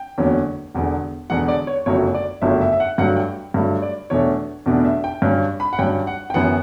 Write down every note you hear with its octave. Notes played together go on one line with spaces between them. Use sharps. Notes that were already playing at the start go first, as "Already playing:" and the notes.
Already playing: G5
F#1 E2 D3 F#3 C#4
E1 E2 D3
E1 E2 D3 F#5
D5
C#5
G1 F#2 C#3 F#3 A3 C#5
D5
G1 F#2 C#3 F#3 A3 E5
E5
E5
F#5
G2 F#3 A3 F#5
G5
G2 F#3 A3
D5
E2 B2 A3 D4 C#5
E2 B2 A3 D4
E5
G5
G2 F#3 C#4
B5
F#5
G2 F#3 C#4 G5
F#5
G5
F#2 E3 B3 F#5